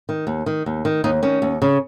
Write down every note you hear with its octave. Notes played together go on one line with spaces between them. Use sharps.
D#3
D#2
D#3
D#2
D#3
D#2 D#4
D#3 C#4
D#2
C#3